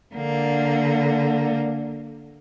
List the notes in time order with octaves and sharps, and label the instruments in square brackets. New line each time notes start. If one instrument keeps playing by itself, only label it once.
[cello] D3 A#3